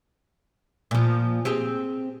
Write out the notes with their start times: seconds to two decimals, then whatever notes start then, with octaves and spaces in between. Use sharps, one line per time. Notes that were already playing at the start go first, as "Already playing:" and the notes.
0.91 A#2 F3
1.45 C4 G4 G#4